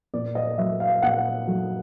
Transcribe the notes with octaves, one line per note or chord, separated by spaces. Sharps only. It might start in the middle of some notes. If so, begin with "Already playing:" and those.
A#2 D5
D#5
F#3 A3 E5
F5
A#2 F#5
F#3 A3